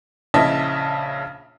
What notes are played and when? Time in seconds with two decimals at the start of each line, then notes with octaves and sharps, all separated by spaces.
0.34 A#1 C#3 E4 D#5 E5 A5